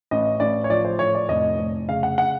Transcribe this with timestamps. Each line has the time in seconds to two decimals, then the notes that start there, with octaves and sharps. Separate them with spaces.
0.11 A1 D#5
0.40 A1 D5
0.64 C#5
0.70 F3 D5
0.85 C5
0.99 A2 C#5
1.15 D5
1.29 F1 D#5
1.59 F1
1.89 C#3 F5
2.03 F#5
2.18 F#5